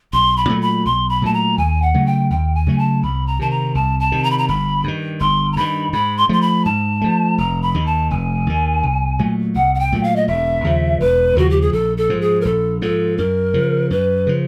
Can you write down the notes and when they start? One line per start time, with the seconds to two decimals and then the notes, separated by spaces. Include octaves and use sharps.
0.13 B1 C6
0.37 B5
0.49 A#2 F#3 A3
0.61 B5
0.85 B1 C6
1.09 B5
1.22 A#2 F#3 A3 A5
1.34 A#5
1.58 D#2 G#5
1.82 F#5
1.94 C#3 F#3 A3
2.06 G5
2.30 D#2 G5
2.55 G#5
2.67 C#3 F#3 A3
2.79 A5
3.03 C2 B5
3.27 A#5
3.39 C3 D#3 A5
3.51 A#5
3.75 C2 A5
4.00 A5
4.12 C3 D#3
4.24 A#5
4.31 B5
4.38 A#5
4.48 G1 B5
4.84 G2 D#3
5.20 G1 C6
5.52 A#5
5.56 G2 D#3 B5
5.93 G#2 B5
6.17 C6
6.29 F3 A3 C6
6.41 B5
6.65 G#2 A5
7.01 F3 A3
7.38 F1 A#5
7.62 B5
7.74 D#2 D#3
7.86 A5
8.10 F1 G#5
8.47 D#2 D#3
8.83 C2
9.19 A#2 F#3 A3
9.55 C2 F#5
9.75 F#5
9.79 G5
9.92 A#2 F#3 A3
10.03 F5
10.16 D#5
10.28 E1 E5
10.64 D#2 C#3 F3
11.00 E1 B4
11.36 D#2 C#3 F3 F#4
11.50 G4
11.61 G#4
11.73 A#1 A4
11.97 A4
12.09 G#2 F3
12.21 G#4
12.41 A#4
12.45 A#1 A4
12.81 G#2 F3 A4
13.17 F#2 A#4
13.54 C#3 F3
13.90 F#2 B4
14.27 C#3 F3